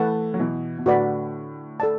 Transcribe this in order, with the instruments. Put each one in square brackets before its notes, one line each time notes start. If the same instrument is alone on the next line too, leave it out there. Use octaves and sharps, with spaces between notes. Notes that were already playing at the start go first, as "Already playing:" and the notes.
Already playing: [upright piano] E3 A3 [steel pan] B4 F#5 A5
[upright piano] F#3
B2 E3
B2
[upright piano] A2 D3 [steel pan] F#4 B4 D5 B5
[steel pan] A4 D5 A5